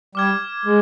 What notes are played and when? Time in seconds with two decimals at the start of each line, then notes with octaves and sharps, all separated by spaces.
0.15 G3 D6 F6 G#6
0.65 G#3